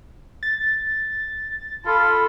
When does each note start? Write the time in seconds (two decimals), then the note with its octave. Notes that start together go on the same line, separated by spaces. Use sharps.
0.43 A6
1.86 F4 A4 B5